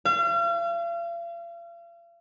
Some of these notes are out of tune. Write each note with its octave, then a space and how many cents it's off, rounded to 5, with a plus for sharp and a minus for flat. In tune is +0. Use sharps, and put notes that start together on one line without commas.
F5 -40